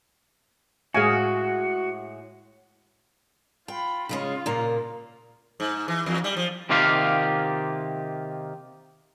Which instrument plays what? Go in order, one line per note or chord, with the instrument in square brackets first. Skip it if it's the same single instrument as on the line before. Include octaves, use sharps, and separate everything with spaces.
[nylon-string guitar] A2 G#3 [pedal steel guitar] F#4 [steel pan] G#4 F5 G#5
[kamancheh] F4 B5 [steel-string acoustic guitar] G5
[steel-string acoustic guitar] C#3 G#3 C#4 [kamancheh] F4
[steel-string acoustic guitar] A#2 C#3 A#3
[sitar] G#2
E3
E2
G3
F3
[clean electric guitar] C3 D#3 A#3 F4 G4 F5